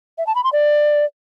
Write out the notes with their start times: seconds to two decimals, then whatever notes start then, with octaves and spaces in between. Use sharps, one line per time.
0.18 E5
0.27 A5
0.35 B5
0.44 C6
0.53 D5